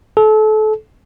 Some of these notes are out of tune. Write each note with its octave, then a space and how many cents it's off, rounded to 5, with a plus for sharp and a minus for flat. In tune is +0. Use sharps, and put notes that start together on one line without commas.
A4 -30